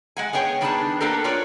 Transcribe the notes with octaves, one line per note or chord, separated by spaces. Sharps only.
G#3 F#5 G#5
B3 G#4 C#5 G5
D#3 G3 B3 D4 G#4 A5
A#3 B3 D4 G4 A4 A#4
F4 A#4 B4 C#5 D5